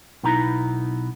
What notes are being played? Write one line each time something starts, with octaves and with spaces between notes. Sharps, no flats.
B1 B3 D#4 E4 A#5